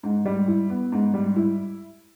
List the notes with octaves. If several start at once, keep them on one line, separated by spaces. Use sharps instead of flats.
G#2
G3
E4
B3
G#2
G3
E4